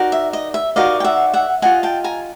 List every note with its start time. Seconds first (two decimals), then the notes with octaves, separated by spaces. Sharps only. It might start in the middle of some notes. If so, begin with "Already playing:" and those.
Already playing: D#4 F#4 A#4 D5
0.12 E5
0.33 D#5
0.54 E5
0.76 D#4 F#4 A#4 D5 D#5 F5
1.00 G5
1.04 E5 F#5
1.33 E5 F#5
1.62 F4 A#4 D#5 F#5 G#5
1.83 G5 A5
2.04 G#5 A#5